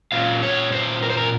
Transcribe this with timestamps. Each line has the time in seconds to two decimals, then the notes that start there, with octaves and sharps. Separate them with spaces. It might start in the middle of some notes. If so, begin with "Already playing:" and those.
0.12 A#2 F#3 C#4 F4 F5
0.43 C#5
0.72 C5
1.03 A#4
1.10 C5
1.17 A#4